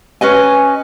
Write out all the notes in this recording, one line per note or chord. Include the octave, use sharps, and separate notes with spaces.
C#4 B4 D#5 G#5